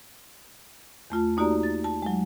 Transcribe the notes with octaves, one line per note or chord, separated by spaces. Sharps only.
E2 A3 F4 A5
A#3 D#4 F#4 G4 D5 A#5
A6
A5
F#3 G#3